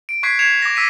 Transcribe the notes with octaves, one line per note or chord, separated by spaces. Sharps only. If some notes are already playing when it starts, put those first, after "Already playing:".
D7
C#6 F#6 G#6 B6 C7
G#6 C7 C#7 E7 F7
D6 A#6
D6 E6 B6 D#7